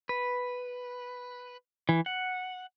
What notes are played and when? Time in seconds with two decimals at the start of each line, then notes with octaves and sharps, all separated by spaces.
0.09 B4
1.89 E3
2.06 F#5